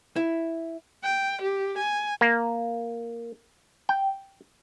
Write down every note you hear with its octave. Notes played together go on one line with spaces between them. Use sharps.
E4
G5
G4
G#5
A#3
G5